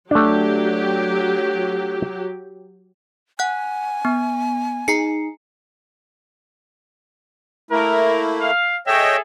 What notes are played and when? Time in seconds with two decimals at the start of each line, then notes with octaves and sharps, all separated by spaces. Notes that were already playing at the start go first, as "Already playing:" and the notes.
0.11 F#3 A3 D4 G4
3.39 F#5 G#5 F#6
4.05 B3
4.88 D#4 G#4 A#5 C7 C#7
7.71 A3 A#3 E4 A#4
8.41 F5
8.87 G#4 A4 C#5 D#5 E5 G5